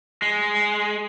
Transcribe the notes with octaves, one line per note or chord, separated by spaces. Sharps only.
G#3